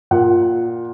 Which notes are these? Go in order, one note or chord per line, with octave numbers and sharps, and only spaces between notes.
A#2 F#5